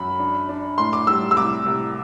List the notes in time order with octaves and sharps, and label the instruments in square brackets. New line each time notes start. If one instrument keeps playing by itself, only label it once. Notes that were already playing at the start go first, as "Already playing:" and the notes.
Already playing: [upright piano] F#2 B5
D4
D4
A2 C6
D6
G3 E6
E6
C2 D6
C2